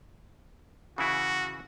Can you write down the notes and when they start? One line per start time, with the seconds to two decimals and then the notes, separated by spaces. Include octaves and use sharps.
0.98 C#3 E3 E4 F#4